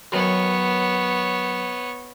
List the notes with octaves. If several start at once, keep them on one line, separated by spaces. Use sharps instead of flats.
F#2 D#3 B3 C#5